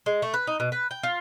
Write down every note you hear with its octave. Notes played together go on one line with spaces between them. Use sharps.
G#3
A3
B4
D#4
B2
B4
G5
F4